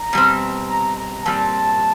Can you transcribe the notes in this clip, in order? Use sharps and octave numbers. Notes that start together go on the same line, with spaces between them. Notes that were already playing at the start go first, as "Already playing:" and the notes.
Already playing: A#5
B2 G3 C4
A#5
A#5
A#2 G3 C4 A5